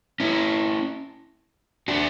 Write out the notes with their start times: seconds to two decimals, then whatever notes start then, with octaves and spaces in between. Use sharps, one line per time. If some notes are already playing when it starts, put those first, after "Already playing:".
0.20 C#4 E4
1.88 D4 F#4